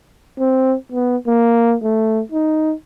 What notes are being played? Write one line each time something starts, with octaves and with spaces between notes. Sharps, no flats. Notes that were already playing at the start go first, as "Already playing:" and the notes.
C4
B3
A#3
A3
D#4